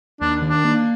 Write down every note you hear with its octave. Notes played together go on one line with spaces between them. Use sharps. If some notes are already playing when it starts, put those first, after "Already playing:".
D#2 D4
D#3
D4
A#3